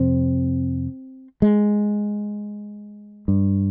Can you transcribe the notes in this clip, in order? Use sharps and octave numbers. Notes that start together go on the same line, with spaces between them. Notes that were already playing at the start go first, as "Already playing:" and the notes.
Already playing: F2 C3 C4
G#3
G2